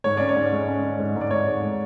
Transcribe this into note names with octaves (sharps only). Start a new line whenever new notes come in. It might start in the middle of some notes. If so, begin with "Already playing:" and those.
G#2 C#5
C#4 D5
C#5
G#2
G#3
C#4
G#3
G#2
G#2
D5
G#2 C#5
G#2
G#3